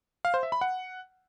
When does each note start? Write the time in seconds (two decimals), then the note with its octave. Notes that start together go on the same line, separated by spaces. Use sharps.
0.25 F5
0.34 C5
0.43 E5
0.52 B5
0.61 F#5